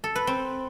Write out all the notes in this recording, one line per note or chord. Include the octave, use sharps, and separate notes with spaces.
A4
B4
C4